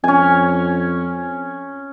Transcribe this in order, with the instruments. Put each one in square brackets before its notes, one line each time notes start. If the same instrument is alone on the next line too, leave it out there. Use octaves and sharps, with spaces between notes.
[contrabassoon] F2 [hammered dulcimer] C#4 G#5